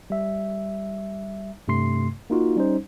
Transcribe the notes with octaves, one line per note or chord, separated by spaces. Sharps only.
G3 E5
G2 C3 A3 C6 C7
A#3 D#4 F4 F#4
G3 C#4 D#4 C5